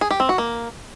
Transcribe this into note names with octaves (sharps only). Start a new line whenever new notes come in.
G#4
G4
C4
F#4
A#3